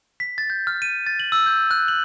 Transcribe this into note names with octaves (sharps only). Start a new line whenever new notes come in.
B6
A6
G6
F6
D#7
A6
F#7
E6
G6
F#6
F#7